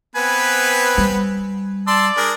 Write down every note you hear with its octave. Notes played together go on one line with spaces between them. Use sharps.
B3 C4 B4 G#5
G3
D5 A5 C6 E6
D4 G#4 A#4